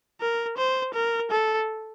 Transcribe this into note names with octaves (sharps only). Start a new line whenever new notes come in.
A#4
C5
A#4
A4